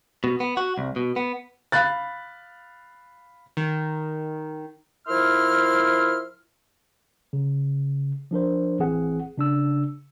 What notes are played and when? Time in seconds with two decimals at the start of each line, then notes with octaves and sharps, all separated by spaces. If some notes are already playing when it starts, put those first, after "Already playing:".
0.24 B2
0.40 B3
0.57 F#4
0.78 C2
0.96 B2
1.16 B3
1.72 F5 B5 F#6 A6
3.57 D#3
5.07 F3 E4 A#4 E5 C6 F6
7.33 C#3
8.31 F3 D4 A#4 C5
8.79 A1 E3 C4 G#4 F#5
9.38 C#3 D4 E6